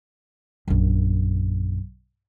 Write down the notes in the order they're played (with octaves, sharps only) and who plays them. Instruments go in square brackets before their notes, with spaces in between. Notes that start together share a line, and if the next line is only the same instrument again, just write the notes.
[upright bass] A#1 F#2